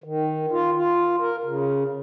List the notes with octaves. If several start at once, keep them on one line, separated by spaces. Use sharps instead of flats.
D#3
F4
F4
A#4
C#3